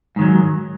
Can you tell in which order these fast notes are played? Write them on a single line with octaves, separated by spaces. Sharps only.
G#2 D#3 F#3